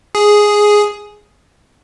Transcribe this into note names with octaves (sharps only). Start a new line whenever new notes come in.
G#4